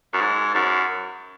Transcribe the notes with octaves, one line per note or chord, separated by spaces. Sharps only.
F#2
G#2
F#2